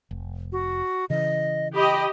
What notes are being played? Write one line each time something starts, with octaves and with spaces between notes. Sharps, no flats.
F1
F#4
C#3 E3 D#5
G4 D#5 B5